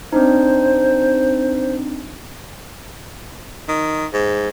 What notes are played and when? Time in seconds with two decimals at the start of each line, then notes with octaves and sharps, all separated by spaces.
0.13 C4 D4 D#4 C5
3.68 D#3
4.13 G#2